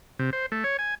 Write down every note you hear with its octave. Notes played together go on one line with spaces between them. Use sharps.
C3
C5
A3
C#5
G#5